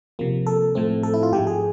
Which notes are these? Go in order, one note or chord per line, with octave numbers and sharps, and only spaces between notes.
C3 F3 A#3
A4
A2 F3 A3 C4
A4
E4
F4
G#2 F3 G#3 G4
G#4